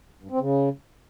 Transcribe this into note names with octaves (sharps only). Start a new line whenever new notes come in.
G2
C4
C#3